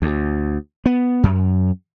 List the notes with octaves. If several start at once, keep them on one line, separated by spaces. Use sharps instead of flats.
D2
B3
F#2